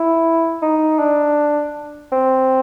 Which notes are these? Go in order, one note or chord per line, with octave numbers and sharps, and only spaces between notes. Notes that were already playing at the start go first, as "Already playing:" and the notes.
Already playing: E4
D#4
D4
C4